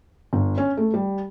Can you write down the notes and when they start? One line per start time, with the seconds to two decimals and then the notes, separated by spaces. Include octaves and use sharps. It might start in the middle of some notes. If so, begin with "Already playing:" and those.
0.33 G1
0.58 C#4
0.77 A3
0.94 G3